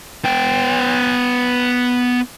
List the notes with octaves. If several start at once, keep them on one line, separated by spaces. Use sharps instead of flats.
B3 G5